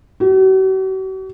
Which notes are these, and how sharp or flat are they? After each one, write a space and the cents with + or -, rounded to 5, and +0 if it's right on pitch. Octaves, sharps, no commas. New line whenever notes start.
F#4 +45